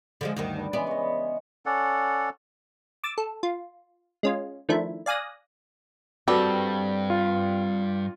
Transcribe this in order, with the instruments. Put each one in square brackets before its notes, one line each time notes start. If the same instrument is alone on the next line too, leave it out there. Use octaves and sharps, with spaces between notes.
[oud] D3 F3 G#3
D2 G2 D#3
[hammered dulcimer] D4 B4
[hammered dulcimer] C#3 E3 G#3 [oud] B3 D5
[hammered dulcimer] C#5 D#5
[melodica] C#4 A4 D5 F#5
[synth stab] D6 E6 A6
A4
F4
G#3 C#4 F4
D#3 F3 A3 D4 E4
D5 F5 G#5 D#6 F#6 A#6
[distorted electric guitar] G2 [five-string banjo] G3 A4 [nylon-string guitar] C4 F#4 B4
[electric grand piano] F4